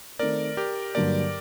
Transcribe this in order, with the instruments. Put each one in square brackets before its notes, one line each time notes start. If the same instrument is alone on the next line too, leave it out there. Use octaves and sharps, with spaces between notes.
[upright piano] D#3 A3 C4 [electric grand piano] A#4 D5
[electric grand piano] G4 A#4
[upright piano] G2 D3 F#3 A#3 [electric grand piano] A#4 D5